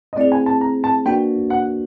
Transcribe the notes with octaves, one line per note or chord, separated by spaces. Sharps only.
D#5
A3 C4 E4 G#4 D5
G#5
A5
A#5
A5
A#3 D4 F#4 B4 G5
F#5